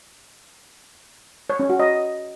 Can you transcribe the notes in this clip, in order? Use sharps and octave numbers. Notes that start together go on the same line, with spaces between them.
C#5
C#4
F#4
D#5